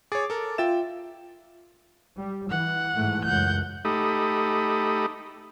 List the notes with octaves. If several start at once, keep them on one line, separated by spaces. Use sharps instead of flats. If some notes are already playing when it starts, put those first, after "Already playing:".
G#4 C#5 D6 A6
A4 A#4
F4 E5 G5 A6 E7
G3
E3 F#5
G#2 E3 A3
C#2 F#2 F#5 G6
A3 D#4 G4 A4 B5 D#6